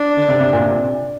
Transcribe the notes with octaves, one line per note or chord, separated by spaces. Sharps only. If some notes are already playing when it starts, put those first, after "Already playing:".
Already playing: D4
D3
C3
C3
A#2
C3